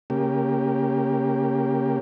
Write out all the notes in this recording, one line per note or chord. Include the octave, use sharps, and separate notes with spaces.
C#3 A#3 G4